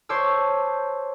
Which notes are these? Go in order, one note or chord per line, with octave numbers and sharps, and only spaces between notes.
C5 C#5 A5 D6 E6